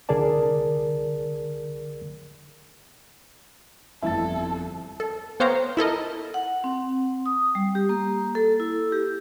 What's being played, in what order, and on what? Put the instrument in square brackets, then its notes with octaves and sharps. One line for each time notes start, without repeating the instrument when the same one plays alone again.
[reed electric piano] C2 D3 G#4 A#4 D5 A5
[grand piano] G1 F2 A6 [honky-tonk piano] E4 [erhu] A4
[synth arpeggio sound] A4
B3 C5 C#5 F5 G5 A#5
E4 A4 A#4 D#5
[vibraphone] F#5
C4
D#6
G3
G4
A#3
A4
E4
G4